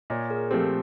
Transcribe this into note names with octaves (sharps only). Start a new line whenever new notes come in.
A#2 C#5 D#5
G#4 A#4
F3 A3 C4 G4 A4